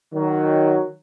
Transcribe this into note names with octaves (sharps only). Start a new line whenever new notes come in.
D#3 F#3